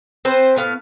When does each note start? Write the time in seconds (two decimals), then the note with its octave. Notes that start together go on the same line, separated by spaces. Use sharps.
0.25 C4 B4 C5
0.56 A2 B3 F5